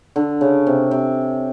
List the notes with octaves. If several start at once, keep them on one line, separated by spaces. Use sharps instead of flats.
D3
C#3
C3
C3